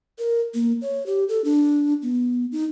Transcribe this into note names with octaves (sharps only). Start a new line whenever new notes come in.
A#4
A#3
C#5
G4
A4
D4
B3
D#4